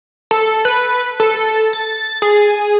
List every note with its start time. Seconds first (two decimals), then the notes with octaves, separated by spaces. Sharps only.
0.31 A4
0.65 B4
1.20 A4
1.73 A6
2.22 G#4